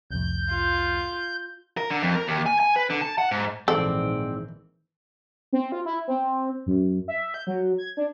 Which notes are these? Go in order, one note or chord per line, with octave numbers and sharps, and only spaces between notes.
C2 F2 A2 G6
F4
A#4
D3
F2
A#4
D#2
G#5
G#5
B4
D3
A5
F#5
G#2
A#1 G#2 D#3 E3 C4 A4 D5
C4
F4
E4
C4
F#2
E5
G6
F#3
G#6
D4